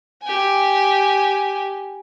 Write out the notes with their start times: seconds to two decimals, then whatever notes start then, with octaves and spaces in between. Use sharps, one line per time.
0.23 G4 G#5